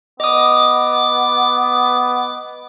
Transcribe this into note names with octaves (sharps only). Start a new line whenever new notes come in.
B3 D#5 D6 D#6